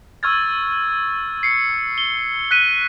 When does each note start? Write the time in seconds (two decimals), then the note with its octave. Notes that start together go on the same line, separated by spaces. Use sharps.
0.23 C#6 E6 F6 G#6 A6
1.43 C7 C#7
1.98 G7
2.51 F#6 B6 D#7